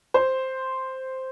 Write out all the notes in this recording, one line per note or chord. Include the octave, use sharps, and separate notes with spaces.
C5